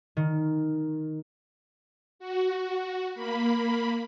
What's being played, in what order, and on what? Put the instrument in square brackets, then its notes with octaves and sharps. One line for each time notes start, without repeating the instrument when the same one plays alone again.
[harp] D#3
[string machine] F#4
A#3 B5